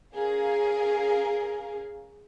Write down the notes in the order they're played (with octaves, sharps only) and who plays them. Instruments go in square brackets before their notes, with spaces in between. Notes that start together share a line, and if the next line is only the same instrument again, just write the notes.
[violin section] C#4 G#4 A#4 F5